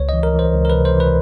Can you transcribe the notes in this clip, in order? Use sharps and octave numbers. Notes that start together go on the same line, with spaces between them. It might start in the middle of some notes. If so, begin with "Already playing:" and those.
Already playing: C#2 C#5
E3 D#5
A#4
E3
C5
C#2
A#4
C3 B4
C5
E3
B4